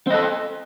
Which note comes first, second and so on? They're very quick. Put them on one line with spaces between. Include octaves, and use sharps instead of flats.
C4 D#5 A4